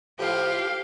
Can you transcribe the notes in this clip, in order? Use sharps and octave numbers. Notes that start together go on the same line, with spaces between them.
A2 F3 G4 F5